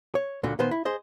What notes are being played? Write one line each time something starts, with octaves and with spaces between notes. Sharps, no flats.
C#5
C#2 A#2 D3 F#4
A#2 D#3 B3 C5
E4
G#4 C5 D#5